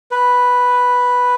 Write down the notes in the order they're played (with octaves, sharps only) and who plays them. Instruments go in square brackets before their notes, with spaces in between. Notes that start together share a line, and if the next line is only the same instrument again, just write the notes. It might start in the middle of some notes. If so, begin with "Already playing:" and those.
[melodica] B4